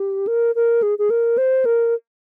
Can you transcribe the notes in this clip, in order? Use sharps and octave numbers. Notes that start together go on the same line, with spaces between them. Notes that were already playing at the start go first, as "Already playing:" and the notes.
Already playing: G4
A#4
A#4
G#4
G#4
A#4
C5
A#4